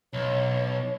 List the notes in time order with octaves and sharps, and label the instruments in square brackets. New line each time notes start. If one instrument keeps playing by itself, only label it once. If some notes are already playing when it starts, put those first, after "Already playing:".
[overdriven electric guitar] B1 [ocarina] C#5